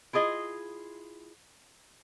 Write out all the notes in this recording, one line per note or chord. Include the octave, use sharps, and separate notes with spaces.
E4 F4 G#4 D#5